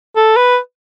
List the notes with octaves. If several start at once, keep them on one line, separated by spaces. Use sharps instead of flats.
A4
B4